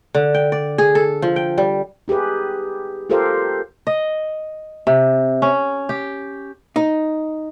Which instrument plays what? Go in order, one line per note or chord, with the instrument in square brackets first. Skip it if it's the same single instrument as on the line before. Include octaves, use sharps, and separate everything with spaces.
[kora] D3
G5
D5
G#4
A4
F3
G5
G3
[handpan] D#4 G4 G#4 B4
F4 G4 A4 A#4 C5 F5
[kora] D#5
C3
C#4
G4
[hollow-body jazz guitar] D#4